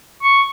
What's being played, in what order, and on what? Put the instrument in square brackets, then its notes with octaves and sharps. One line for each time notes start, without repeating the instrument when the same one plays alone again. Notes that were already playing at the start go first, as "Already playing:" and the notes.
[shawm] C#6